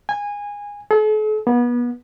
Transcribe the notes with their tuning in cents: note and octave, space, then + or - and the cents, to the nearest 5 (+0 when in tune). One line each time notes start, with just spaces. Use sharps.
G#5 -20
A4 -45
B3 -30